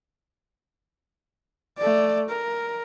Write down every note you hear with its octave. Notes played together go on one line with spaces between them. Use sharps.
A3 D5
A#4